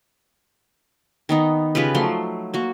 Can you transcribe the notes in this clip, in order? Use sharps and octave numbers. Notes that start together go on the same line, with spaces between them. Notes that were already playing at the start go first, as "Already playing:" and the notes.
D#3 B3 D#4
C#3 F4 G4 B4
F3 F#3 A3 C6
A#3 F#4